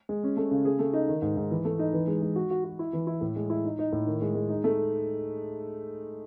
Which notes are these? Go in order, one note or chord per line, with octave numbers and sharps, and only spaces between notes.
G#3
C#4
A3
C#3
G#4
A3
D#4
D#3
G#2
G#2
E3
A3
D#4
E3
G#3
G#3
F#4
F#4
F#4
E4
E3
E4
A2
G#3
E4
D#4
D#4
A2
D#3
G#3
G#3
D#4
A3